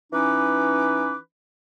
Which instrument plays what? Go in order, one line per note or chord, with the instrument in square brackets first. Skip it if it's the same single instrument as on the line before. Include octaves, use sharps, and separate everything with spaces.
[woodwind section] E3 C#4 D#4 B4 D6